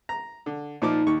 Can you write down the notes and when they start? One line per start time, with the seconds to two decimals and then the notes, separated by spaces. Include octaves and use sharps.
0.09 A#5
0.46 D3
0.82 A#2 F3 D#4 D6
1.07 D#2 C#6